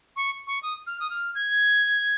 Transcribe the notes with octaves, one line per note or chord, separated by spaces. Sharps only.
C#6
C#6
D#6
F6
D#6
F6
G#6